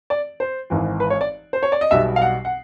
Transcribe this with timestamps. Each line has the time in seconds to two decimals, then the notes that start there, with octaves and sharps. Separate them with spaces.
0.10 D5
0.40 C5
0.70 G#1 G#2 E3
1.00 B4
1.10 C#5
1.21 D5
1.53 C5
1.63 C#5
1.72 D5
1.81 D#5
1.91 B1 B2 G3 B3 E5
2.16 F5
2.22 F#5
2.45 F#5